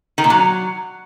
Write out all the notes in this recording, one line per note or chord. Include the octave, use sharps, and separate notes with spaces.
D#3
A#2
F#3